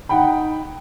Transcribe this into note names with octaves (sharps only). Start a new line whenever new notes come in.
D#4 F#5 G5 B5